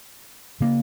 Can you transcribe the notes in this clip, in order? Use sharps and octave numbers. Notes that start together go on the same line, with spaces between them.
C#3 A#3